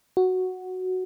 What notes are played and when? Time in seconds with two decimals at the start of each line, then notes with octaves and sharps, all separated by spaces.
0.17 F#4